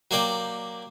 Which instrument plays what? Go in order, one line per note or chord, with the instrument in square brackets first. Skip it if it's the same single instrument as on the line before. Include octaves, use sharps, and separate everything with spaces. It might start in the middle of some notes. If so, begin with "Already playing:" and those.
[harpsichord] F#3 A#3 D5 G5 D6